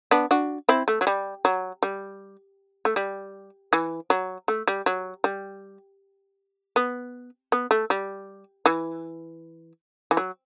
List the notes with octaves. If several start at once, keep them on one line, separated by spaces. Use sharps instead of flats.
B3 D4
D4 F#4
C4 E4
A3
F#3
G3
F#3
G3
A3
G3
E3
F#3
A3
G3
F#3
G3
B3
B3
A3
G3
E3
E3
F#3